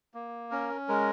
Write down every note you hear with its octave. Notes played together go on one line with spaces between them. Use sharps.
A#3
C#4 A#4
G#3 A#4